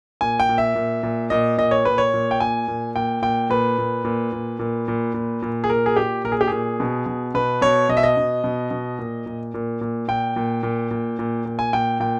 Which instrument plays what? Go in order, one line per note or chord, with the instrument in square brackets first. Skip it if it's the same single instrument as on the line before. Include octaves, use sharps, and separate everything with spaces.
[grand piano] A#2 G#5
G5
A#2
E5
A#2
A#2
A#2 D#5
A#2 D#5
C#5
A#2 B4
C#5
A#2
G5
A#2 G#5
A#2
A#2 G5
A#2 G5
A#2 B4
A#2
A#2
A#2
A#2
A#2
A#2
A#2
G#4
A#2 A#4
G#4
A#2 G4
A#2 A#4
G#4
G4
A#2 G#4
B2
B2
B2 B4
B2 C#5
B2 D#5
E5
D#5
B2
B2
B2
A#2
A#2
A#2
A#2
A#2 G5
A#2
A#2
A#2
A#2
A#2
G#5
A#2 G5
A#2 G5